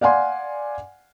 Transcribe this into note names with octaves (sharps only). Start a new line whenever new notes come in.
D5 F5 F#5 G#5 C6